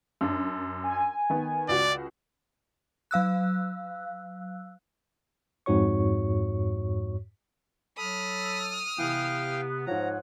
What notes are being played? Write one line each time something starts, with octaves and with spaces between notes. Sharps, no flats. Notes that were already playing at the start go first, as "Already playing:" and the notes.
F#2 D4
G#5
D#3 B3
C#2 F#4 D5
F#3 F5 E6 F#6
F2 G#2 F#4 C#5 C#6
F#3 A4 B5 D#6 F6
C3 E3 B3 F5 G5
G#2 F3 C#5 F#5 A#5